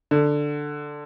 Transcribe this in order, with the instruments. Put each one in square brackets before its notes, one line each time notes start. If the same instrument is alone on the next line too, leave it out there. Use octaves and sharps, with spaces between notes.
[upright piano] D3